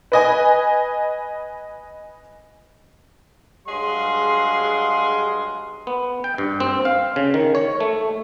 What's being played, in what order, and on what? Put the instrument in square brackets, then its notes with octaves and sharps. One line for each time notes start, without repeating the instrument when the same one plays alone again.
[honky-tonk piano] B4 D#5 G#5
[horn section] G2 F#3 G#3 G#4 F5 C6
[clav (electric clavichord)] B3
G5
G2
C4
F5
C#3
D#3
C#5
A3